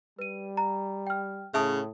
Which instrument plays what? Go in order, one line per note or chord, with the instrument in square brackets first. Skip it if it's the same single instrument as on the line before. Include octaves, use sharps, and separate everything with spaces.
[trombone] G3 [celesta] B4 D#7
[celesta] A#5
G5 F6
[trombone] A2 [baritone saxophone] C#3 [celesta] E5 A5 D#6